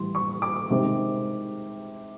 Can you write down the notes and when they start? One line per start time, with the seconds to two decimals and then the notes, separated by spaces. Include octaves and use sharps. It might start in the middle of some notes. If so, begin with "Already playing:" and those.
Already playing: A2 E3 G3 C6
0.15 C#6
0.42 D6
0.70 C3 D#3 G#3 C4